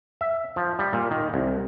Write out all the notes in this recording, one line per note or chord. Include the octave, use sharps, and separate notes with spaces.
E5
F3
G3
A#2
D#3
C2